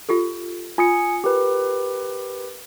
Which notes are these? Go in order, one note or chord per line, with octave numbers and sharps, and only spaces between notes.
F4 G4 A4
F4 G#5 D#6 C#7
G4 A#4 B4